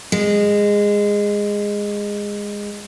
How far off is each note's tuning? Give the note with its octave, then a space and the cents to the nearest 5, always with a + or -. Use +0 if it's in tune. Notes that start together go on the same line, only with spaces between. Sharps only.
G#3 -15